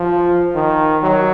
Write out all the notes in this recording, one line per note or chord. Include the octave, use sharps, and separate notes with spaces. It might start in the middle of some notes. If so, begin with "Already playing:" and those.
Already playing: F3
D#3
F#3